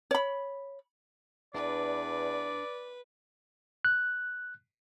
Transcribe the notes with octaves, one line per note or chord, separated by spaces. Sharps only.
C#5 B5
E2 D4 B4 D5
F#6